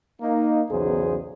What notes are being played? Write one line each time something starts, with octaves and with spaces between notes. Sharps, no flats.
A#3 D#4
B1 E2 C#3 G#4 C5